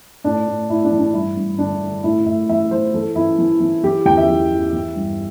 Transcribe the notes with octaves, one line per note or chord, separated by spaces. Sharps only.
A2 D4
A2
A2 E4
D4
E3
D4
G2 E4
G2
D3 D4
D3
A2 E4
A2 E5
E3 E5
E3 C5
E3 A4
E3 E4
E3
E3
E3 G4
E2 G5
E5
E3
E3
E3
G2